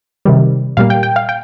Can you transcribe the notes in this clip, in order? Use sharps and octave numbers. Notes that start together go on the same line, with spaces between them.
C3 D#3 G3
A#2 G3 A#3 F5
G5
G5
F5
G5